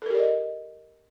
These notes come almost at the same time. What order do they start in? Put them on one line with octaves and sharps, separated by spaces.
A4 A#4 G4 D5 D#5